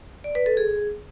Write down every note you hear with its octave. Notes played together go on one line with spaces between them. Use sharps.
D5
B4
A4
G#4